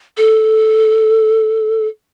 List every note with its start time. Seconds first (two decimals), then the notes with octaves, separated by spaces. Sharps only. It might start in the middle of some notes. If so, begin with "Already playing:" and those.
0.17 A4